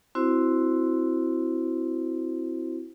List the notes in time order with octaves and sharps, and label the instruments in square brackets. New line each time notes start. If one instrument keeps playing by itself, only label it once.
[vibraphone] C4 E4 F#4 C5